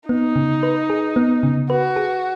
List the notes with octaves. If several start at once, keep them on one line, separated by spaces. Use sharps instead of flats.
B3 D#4
C#3
B4
G#4
B3
C#3
F#4 B4
G#4